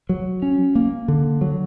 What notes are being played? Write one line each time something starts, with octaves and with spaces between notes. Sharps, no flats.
F#3
C#4
A#3
D3
F#3